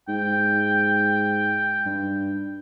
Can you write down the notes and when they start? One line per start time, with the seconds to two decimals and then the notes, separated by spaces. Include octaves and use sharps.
0.08 G#2 G5
1.86 G2